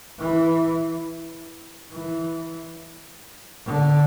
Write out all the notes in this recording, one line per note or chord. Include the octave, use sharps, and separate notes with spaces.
E3
E3
D3